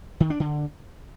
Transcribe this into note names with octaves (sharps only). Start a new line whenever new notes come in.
D#3
D4
D3